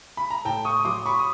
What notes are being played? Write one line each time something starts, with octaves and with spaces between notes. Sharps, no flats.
B5
A#5
A2 G5 A5
C#6 D#6
D#6
F#3 C6 D6
B5 C#6
D#6